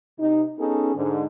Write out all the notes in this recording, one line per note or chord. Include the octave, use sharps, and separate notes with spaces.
C3 D#4
B3 C#4 D#4 G#4 A4
G#2 D3